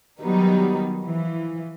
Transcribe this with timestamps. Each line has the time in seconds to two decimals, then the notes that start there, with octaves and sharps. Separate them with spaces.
0.20 D#3 F#3 G3 B3 D#4
1.03 E3 F3